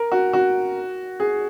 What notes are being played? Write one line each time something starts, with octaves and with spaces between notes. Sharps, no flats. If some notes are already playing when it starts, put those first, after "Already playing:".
Already playing: A#4
F#4
F#4
G#4